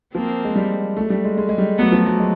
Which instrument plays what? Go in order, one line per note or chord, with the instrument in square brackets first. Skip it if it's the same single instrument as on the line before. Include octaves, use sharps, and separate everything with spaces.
[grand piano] F3 [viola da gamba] A#3 C4
[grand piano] G#3
G3
A3
G3
G#3
G#3
G#3
G3
[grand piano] F#3 [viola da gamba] A3 B3
[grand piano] F3
F#3
G#3